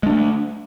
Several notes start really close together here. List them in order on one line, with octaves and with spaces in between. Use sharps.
G#3 D4 A3